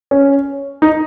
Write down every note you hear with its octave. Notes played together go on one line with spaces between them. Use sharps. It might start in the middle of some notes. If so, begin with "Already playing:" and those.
C#4
D#4